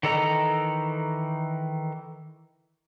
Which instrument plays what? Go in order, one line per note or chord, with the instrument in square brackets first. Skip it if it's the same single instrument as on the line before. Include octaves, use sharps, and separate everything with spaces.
[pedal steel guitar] D#3 E3 A4 D#5 A#5